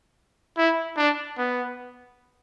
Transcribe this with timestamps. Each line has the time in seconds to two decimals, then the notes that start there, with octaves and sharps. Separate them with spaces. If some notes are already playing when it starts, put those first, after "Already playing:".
0.57 E4
0.97 D4
1.38 B3